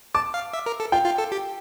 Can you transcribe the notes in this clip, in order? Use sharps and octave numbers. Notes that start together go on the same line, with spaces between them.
A5 D6
F5
E5
A#4
A4
F4 G5
F4
A4
G4